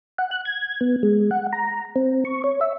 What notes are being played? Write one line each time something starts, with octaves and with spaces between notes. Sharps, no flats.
F#5
F#6
G#6
B3
G#3
F#5
A#5
C4
C#6
C#5
E5